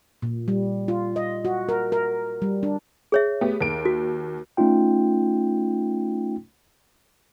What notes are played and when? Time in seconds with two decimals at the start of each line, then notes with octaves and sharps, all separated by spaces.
0.22 A#2
0.48 G3
0.88 F4
1.16 D#5
1.45 F#4
1.69 A#4
1.92 A#4
2.42 G3
2.63 D4
3.12 G#4 C#5 E5
3.41 A3 B3 G4
3.61 D#2 D7
3.85 F#4
4.57 A3 C#4 D#4 F4 G5